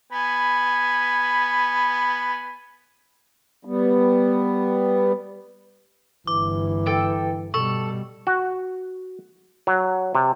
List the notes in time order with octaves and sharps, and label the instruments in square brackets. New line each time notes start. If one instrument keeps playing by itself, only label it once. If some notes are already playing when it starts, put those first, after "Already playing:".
[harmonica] B3 G#5 B5
[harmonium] G3 B3
[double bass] G1 [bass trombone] E3 [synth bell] D6
[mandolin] A4 G5 E6
[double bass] B2 G3 [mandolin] A4 [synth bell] C#6
[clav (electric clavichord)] F#4
F#3
C3